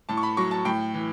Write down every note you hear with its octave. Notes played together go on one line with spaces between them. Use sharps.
A2 A5
C#6
B5
F#3 C#6
A5
A2 G5
E3